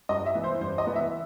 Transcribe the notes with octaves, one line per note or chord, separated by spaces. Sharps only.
G2 D#5
E5
E3 B3
C5
G2 C5
D#5
E3 B3
E5